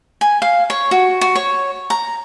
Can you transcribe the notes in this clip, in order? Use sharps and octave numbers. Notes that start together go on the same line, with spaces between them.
G#5
F5
C#5
F#4
F#4
C#5
A#5